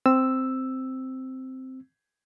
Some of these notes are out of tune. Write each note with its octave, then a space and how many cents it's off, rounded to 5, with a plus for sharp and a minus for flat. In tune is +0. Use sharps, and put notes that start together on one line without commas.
C4 -5 E6 +0